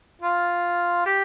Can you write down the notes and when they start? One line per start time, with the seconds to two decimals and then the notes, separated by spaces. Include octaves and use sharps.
0.22 F4
1.06 G4